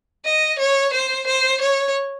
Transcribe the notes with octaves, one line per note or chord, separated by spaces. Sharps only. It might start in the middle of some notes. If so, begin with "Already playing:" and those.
D#5
C#5
C5
C5
C#5